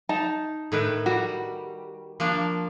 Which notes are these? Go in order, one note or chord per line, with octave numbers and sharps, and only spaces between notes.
D#4 A5
A2 D#3 B4
G3 F#4
F3 A#3 D4